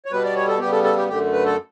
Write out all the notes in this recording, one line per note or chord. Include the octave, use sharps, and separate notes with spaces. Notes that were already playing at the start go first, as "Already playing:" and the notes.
C#5
B2 G3 B3 B4
D5
C#5
A4
C#3 G3 B3 G4
A4
A4
G4
F#2 D3 A3 G4
B4
A4